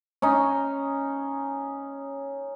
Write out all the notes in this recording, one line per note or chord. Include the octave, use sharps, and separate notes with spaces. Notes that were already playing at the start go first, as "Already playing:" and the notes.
C#4 D#4